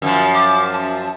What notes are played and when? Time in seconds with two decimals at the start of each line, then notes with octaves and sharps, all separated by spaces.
0.02 F#2 D#3 F3
0.34 D6
0.72 A5